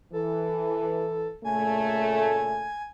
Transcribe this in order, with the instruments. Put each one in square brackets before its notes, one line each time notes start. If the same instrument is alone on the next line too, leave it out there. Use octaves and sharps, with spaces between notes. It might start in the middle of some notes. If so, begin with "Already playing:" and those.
[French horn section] E3 [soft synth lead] A4
[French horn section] A#2 C#3 A3 [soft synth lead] G#5